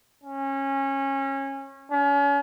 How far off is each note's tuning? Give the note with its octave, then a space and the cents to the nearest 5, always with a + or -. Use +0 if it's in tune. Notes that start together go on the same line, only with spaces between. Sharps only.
C#4 -25
C#4 +35